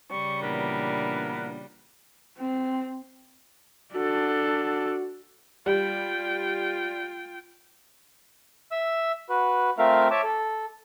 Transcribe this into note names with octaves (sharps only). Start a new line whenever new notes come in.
C#3 G3 C#6
A#2 E3 B3 D4 A#4
C4
D4 F#4 A4
G3 F4 G5
E5 E6
F#4 B4
A3 C4 F4 A#4 E5 F5
C#5 E5 A5 D6
A4